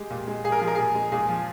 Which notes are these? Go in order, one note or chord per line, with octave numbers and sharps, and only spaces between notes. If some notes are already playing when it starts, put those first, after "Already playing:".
Already playing: G#3 G4
A#2
G#3
A#2 G#4
A#4
F3 G#4
A#4
A#2 G#4
G#3
A#2 G#4
F3